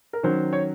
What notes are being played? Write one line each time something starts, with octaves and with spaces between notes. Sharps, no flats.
A#4
D#3 F#3 C#4 C5
C#5